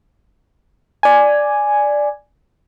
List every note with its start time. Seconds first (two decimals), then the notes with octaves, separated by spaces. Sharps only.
1.03 D5 G#5